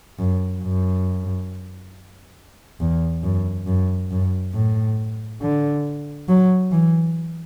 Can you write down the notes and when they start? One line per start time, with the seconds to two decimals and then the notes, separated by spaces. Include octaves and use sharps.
0.19 F#2
0.62 F#2
2.80 E2
3.23 F#2
3.67 F#2
4.11 F#2
4.54 A2
5.41 D3
6.28 F#3
6.72 E3